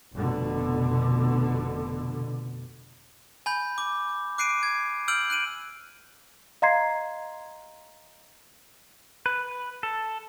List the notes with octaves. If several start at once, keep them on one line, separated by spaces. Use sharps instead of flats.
F1 B2 D3
G#5 B5 G6
D6
D6 F#6 C7 D7 D#7
G#6
E6 F6 G6 D7 F#7
F#6 D7 D#7 F#7
D#5 F5 A#5 C6 G#6 C7
B4
A4